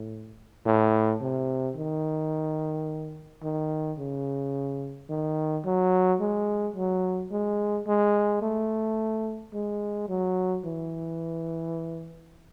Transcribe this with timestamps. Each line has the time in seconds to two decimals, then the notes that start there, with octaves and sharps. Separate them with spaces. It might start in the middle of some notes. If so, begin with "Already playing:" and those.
Already playing: A2
0.66 A2
1.21 C3
1.77 D#3
3.43 D#3
3.98 C#3
5.09 D#3
5.65 F#3
6.20 G#3
6.76 F#3
7.31 G#3
7.87 G#3
8.42 A3
9.54 G#3
10.09 F#3
10.64 E3